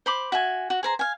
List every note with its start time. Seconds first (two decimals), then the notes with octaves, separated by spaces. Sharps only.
0.06 C5 B5 D6
0.32 F#4 E5 G#5
0.70 F#4
0.83 G#4 C5 A#5
0.99 F5 G#5